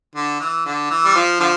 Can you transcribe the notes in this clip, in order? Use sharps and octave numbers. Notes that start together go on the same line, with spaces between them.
D3
E3
D3
E3
G3
F3
D3 F3